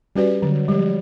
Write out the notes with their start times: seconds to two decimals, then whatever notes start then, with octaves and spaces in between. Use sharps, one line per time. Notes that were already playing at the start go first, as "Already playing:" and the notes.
0.16 G3 C#4 F#4 B4 D5
0.42 D3 F#3
0.68 F3 G3 G#3